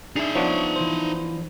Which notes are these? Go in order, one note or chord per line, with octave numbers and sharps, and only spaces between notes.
D4 D#4 G#4 E5
F3 B3 D4 C#5
E3 C5